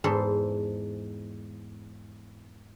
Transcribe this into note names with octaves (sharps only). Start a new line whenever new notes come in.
E2 G#2 A4 C5